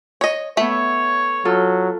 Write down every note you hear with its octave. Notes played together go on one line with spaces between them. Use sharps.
C#5 D#5
A3 B3 C#5 E5
F#3 F4 A4